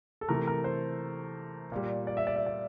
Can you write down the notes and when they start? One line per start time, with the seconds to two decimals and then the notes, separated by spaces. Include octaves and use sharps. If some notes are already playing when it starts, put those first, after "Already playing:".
0.21 A4
0.29 C3 E3 A3 A#4
0.47 A#4
0.64 C5
1.72 A#2 G3
2.07 D5
2.17 E5
2.27 D5
2.36 E5
2.46 D5